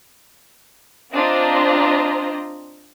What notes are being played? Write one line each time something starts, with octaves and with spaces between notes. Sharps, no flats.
C4 D4 F4 C5 D#5 A#5